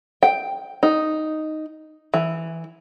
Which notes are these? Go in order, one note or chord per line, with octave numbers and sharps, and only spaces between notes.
G5
D#4
E3